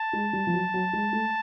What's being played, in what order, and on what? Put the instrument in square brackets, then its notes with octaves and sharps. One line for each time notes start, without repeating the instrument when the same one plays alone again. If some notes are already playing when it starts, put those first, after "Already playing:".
Already playing: [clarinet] A5
[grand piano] G#3
G3
F3
F#3
F#3
G#3
A3